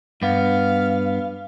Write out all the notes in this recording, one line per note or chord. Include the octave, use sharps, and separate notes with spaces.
G2 B3 F5